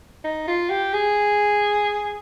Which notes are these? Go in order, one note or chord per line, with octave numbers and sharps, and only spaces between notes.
D#4
F4
G4
G#4